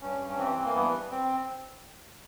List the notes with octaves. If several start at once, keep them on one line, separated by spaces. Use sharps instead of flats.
G2 C#4
G2
C#4
E3 C4
E3
A#3
G2 B3
G2
C4